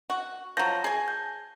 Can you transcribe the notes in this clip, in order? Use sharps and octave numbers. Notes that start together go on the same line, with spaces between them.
F#4
F3 F#3 A5 G6 A#6
G#4 G#5
G6